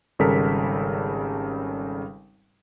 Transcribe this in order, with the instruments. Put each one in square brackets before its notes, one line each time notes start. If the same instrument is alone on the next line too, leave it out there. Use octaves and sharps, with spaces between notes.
[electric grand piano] G#1 C#3 G3 A4 A#4 B6